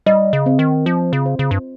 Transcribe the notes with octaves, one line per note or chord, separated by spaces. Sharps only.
G3 D#5
C#3
C4
D#3
F3 F4
C#3
C5
C#3
G2